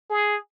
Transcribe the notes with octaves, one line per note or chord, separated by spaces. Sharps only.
G#4